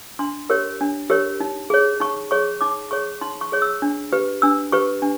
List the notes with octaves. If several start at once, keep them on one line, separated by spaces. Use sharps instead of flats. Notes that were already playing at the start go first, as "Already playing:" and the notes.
D4 C6
G4 A#4 C#5
D4
G4 A#4 C#5
D#4
G#4 C#5
D#4 C#6
G#4 C#5 C#6
D#4 D6
G#4 C#5 C#6
D#4 C6
C#6
G#4 C#5
E6
D4
G4 B4
D4 E6
G4 B4 C#6
D4